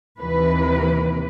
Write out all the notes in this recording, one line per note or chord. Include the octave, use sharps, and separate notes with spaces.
D#2 C3 E3 B4